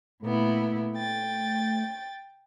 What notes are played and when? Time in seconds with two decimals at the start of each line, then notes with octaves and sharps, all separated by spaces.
0.22 A#2 A3 B3 E4
0.95 G5 A6